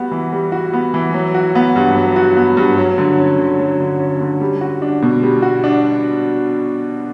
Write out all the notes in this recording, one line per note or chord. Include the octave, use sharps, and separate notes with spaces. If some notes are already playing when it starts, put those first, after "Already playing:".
Already playing: G3 B3 F#4
E3
G3
F#4
B3
E3
F#3
F#4
B3
G2
F#3
F#4
B3
G2
F#3
D3
C#4
D3
F#3
D3
C#4
D3
G3
F#4
D4
B2
G3
F#4
D4